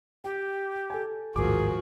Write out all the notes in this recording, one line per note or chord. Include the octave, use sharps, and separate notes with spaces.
G4 G5
A4 G#5
A1 D#2 G#2 F3 F#4 G#4 A#4 D6